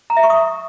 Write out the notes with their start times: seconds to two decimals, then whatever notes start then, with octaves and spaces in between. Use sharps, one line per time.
0.10 A#5
0.17 E5
0.23 C#6
0.30 D#6